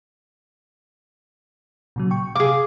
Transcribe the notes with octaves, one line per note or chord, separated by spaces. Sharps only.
A#2 C#3 F#3
G5 C#6
C3 G#4 F5 D6